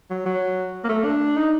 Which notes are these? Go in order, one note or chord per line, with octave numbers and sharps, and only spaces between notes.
F#3
F#3
A#3
A3
D4
D#4